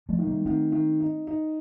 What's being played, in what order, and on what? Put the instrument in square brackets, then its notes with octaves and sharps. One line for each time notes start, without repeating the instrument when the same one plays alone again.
[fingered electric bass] F3 A3
[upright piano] D#3
[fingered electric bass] G3 A#3
[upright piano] D#3 [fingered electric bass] A3 C4
[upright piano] D#3
D#4
D#4